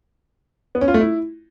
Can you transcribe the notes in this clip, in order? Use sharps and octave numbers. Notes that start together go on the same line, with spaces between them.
B3
C#4
F4
A3
E4